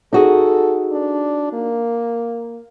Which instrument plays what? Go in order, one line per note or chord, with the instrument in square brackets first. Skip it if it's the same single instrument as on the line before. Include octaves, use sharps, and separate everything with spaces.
[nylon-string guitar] D#4 F#4 G#4 [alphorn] A4
[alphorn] D4
A#3